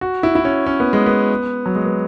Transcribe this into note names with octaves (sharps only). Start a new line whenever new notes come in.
F#4
E4
E4
C#4
C#4
B3
G#3
B3
F#3
G#3
B3